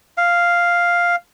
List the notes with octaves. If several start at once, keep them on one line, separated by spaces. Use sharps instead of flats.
F5